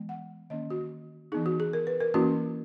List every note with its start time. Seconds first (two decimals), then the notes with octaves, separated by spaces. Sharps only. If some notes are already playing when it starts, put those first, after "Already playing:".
Already playing: E3 G#3 B3
0.09 F#5
0.50 D#3 A#3 C#4 D#5
0.70 F#4
1.32 D#4 G#4
1.34 E3 B3
1.46 F#4
1.60 G#4
1.73 A#4
1.87 B4
2.00 A#4
2.14 E3 A#3 C#4 E4 F#4